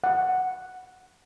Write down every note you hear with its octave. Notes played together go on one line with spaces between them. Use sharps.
F#5